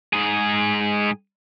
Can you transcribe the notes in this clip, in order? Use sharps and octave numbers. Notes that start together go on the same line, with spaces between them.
G#2 G#4